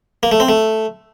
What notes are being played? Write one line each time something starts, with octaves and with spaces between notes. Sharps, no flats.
A#3
A3
C4
A3